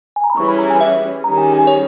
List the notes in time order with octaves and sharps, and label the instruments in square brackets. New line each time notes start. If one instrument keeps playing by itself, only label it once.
[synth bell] G#5
A#5
B5
[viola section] E3 G3 C#4 E4 G#4 [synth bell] C#6
[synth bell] B5
A#5
G#5
E5
[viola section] D#3 G3 C#4 G#4 [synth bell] A#5
[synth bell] G#5
G#5
C#5